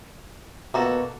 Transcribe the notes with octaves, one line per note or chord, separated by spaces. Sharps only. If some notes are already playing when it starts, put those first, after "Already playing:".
B2 A#3 F#4 A4